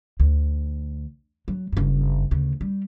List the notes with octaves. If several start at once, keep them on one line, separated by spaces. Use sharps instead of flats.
D2
F#3
F#1 G2
D2 C#3
G3